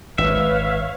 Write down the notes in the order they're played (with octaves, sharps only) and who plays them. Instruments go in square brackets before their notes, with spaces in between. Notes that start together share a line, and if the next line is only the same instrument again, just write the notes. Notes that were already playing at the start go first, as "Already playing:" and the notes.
[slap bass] G#1 [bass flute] B4 [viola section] C#5 F5 [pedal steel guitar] E5